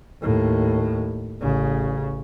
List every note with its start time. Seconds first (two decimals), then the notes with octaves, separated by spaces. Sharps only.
0.22 D#2 A2
1.41 A1 C#3